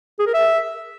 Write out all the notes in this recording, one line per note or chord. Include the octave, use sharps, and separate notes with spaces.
G#4
A#4
E5